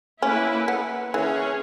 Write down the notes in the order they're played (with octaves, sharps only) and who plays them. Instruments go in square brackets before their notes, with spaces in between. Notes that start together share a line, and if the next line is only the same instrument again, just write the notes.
[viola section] A#3 E4 B4 [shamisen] C#4
[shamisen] B3
[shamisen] E3 [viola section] C#4 G#4 C#5